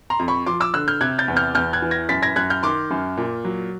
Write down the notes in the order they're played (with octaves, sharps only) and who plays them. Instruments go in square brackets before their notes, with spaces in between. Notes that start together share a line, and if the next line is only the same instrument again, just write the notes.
[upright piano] A#5 C6
F2
B5 C#6
F3 C6 D6
D6 E6
D3 E6 F#6
F6 G6
C3 F#6 G#6
G6 A6
E2
F6 G6
E2 F6 G6
F#6 G#6
E3
G#6 A#6
F#2 A6 B6
G#6 A#6
F#2 F#6 G#6
F6 G6
D#3 C6 D6
F#2
A#2
F#3